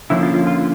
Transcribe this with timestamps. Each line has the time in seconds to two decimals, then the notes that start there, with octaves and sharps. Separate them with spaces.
0.10 D3 F3 A#3 C#4 E4
0.23 F4
0.34 F4
0.47 F4